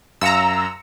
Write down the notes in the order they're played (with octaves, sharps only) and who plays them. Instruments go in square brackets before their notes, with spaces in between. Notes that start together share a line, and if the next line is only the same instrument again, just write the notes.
[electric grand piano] F#2 F5 C#7 [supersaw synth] A#5 E6